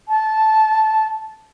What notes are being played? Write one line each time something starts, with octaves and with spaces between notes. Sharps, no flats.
A5